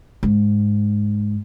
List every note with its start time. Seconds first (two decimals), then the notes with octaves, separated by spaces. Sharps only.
0.23 G#2